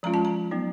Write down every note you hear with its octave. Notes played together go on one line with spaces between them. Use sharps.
F3 G#3 C#4 F4 A#5
A5
A#5
F#3 B3 D#4